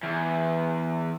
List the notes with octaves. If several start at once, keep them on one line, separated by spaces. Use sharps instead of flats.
E2